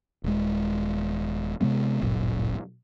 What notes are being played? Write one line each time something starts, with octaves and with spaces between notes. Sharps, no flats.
D#1 G#3
C3 F#3 G#3 B3
D1 G1 F#2 A#2